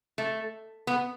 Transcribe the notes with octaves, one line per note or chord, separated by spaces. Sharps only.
A3
B3